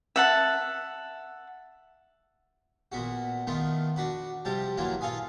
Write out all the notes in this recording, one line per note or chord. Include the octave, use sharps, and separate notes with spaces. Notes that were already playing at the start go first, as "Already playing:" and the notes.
E5 F#5 A5
A#2 B3 F#4
D#3 A3 B3 F4
D4 F#4 B4
C3 F3 G3 A5
E3 F#3 A#3 F4
F4 A4 F5 G#5 D#6